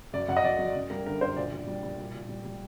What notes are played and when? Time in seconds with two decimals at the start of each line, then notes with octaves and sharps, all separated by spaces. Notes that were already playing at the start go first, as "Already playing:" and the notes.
0.13 F#2 D5
0.28 F#2 F#5
0.37 D#5
0.44 F#3 D5
0.59 F#3
0.75 F#2
0.90 G3 A#4
1.06 D3 A#4
1.21 F#2 C5
1.36 A#2 D5
1.52 A#2
1.67 G3
1.83 G3
1.98 A#2
2.14 A#2
2.29 G3
2.45 G3